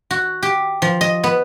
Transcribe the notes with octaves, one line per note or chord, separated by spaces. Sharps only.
F#4
G4
F3
D#5
B3